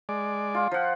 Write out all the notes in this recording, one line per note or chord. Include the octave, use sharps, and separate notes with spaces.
G#3 D5
F4
F3 F#5